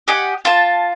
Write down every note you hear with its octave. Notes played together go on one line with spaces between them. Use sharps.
G4 D#5 F#5 G#5
F4 A5